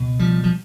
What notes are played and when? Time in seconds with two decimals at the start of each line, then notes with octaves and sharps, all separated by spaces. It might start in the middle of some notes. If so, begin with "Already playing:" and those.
Already playing: C#2 B2
0.19 F3 G3
0.44 F3